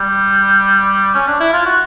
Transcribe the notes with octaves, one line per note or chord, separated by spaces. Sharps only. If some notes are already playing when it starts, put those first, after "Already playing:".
Already playing: G3
C#4
D4
E4
F4
F#4